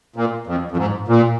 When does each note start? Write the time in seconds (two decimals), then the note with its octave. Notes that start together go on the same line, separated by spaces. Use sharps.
0.16 A#2
0.47 F2
0.71 F2
0.77 G#2
1.08 A#2